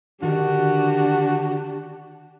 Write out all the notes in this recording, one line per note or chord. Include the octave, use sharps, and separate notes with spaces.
D3 D#3 D4 F#4 G4 A#4